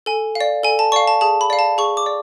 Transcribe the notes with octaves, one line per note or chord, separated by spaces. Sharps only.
A4 G#5
F5
D5
A4 G#5
A5
D5 F5 C#6
A5
G#4 A5
B5
D5 F5
A5
G#4 C#6
D6
D5